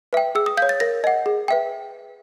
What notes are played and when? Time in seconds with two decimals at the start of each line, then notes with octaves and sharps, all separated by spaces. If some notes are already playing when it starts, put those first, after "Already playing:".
0.13 B4 E5 G5
0.35 G#4 E6
0.46 D#6
0.57 C#5 F5 G6
0.69 A6
0.80 A#4 A#6
1.04 D#5 F#5
1.26 G#4
1.48 B4 E5 G5